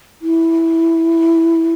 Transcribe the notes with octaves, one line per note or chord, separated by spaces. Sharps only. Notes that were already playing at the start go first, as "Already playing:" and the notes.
E4